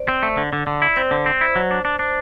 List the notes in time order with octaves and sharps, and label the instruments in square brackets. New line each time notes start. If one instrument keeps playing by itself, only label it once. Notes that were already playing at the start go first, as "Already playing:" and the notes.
Already playing: [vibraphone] C5 D5
[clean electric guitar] C4
A3
D3
D3
D3
E4
[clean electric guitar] C4 [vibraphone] C5
[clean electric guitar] D3
C4
E4
F#3
D4
D4
D4